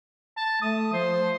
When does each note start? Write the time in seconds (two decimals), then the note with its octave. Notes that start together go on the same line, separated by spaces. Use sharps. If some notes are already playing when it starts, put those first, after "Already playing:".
0.37 A5
0.62 A3 D#6
0.93 F3 C5